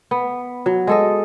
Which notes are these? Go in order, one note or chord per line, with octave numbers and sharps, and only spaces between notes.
B3
F#3
G#3 A4 D#5